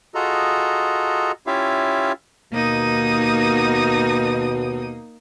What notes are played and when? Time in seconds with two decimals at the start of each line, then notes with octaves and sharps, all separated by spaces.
0.15 F4 F#4 G#4 A4 D#5 A#5
1.47 C#4 E4 F4 G4 E5 F5
2.53 D#2 B2 A#3 D#4 D#6